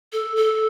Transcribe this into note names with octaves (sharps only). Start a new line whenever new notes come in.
A4
A4